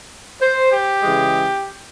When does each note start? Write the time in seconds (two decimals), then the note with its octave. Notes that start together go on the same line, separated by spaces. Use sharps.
0.41 C5
0.71 G4
1.02 C#3 E3 G#3